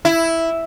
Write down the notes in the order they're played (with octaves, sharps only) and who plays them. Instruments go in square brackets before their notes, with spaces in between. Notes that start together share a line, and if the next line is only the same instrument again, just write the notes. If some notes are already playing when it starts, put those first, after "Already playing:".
[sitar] E4